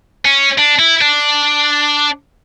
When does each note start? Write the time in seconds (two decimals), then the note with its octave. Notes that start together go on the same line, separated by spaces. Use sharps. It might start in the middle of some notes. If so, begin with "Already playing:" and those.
0.25 C#4
0.58 D4
0.79 E4
1.01 D4